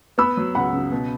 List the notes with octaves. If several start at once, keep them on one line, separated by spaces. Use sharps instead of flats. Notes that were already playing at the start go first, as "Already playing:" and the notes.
B3 B5 E6
F#3
C#2 F#5 B5
C#3
B2